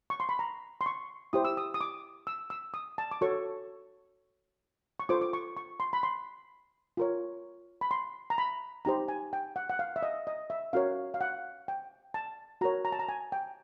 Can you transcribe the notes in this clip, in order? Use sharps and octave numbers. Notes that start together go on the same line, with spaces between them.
C#6
C6
B5
A#5
C6
C#6
E4 G4 C5 D#6
E6
D#6
D#6
D6
E6
E6
D#6
A5
D6
F#4 A4 C#5 C#6
C#6
F4 A4 C5 D6
D6
C#6
C#6
C6
B5
C6
F4 A#4 C#5
B5
C6
A#5
B5
D#4 G4 C5 A#5
G#5
G5
F#5
F#5
F5
E5
D#5
D#5
E5
C#4 F#4 A#4 C#5 F5
F5
F#5
G5
A5
F#4 A#4 C#5 A#5
A#5
A5
A#5
G#5
G5